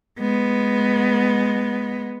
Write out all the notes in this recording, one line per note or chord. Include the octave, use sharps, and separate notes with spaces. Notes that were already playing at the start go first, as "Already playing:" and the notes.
G#3 B3